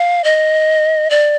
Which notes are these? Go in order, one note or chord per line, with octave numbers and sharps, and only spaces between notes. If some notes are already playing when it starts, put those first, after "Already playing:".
Already playing: F5
D#5
D5